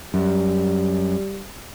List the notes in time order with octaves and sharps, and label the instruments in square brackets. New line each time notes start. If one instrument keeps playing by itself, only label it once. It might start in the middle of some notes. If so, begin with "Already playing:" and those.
[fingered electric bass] F#2 [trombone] G3